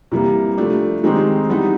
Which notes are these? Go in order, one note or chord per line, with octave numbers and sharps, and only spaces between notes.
C3 E3 G3 A#3
F3 A3 D4 G4
D#3 G#3 C4 D#4 G4
E3 G3 B3 D#4